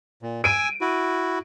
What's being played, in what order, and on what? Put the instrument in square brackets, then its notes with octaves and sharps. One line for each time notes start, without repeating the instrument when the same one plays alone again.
[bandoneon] A#2
[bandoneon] G#5 E6 [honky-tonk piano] D7 D#7
[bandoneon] E4 F#4